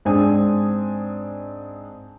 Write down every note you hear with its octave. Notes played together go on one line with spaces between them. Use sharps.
G#2 C4 D4 G#5 D#6